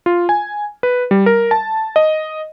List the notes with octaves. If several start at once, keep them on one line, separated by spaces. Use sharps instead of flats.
F4
G#5
B4
G3
A#4
A5
D#5